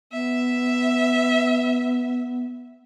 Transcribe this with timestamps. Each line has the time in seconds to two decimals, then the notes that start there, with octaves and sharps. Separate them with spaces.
0.12 B3 E5